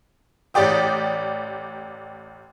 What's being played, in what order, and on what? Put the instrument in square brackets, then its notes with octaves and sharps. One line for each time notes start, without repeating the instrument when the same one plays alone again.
[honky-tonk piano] A1 G4 D5 G5 D#6